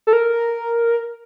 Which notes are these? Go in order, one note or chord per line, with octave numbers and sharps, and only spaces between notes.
A4
A#4